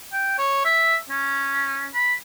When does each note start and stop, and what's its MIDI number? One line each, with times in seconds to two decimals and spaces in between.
0.13 0.34 79
0.39 0.62 73
0.65 0.96 76
1.10 1.88 61
1.94 2.14 83